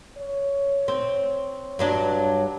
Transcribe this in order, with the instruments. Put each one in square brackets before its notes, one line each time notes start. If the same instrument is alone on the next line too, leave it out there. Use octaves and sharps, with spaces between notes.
[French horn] C#5
[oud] C4
G2 F#3 D4